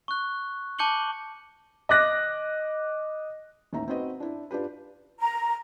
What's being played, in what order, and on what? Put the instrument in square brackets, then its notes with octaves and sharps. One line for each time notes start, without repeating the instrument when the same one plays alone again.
[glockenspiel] C#6 F#6
A5 D6 G6 C#7 F#7 G7
[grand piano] D#5 D6 F#6 A#6
[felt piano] A1 D#2 D#4 E5 A#5
C4 D#4 F#4 B4 D#5
D4 E4
D4 F4 G4 B4
[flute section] A#5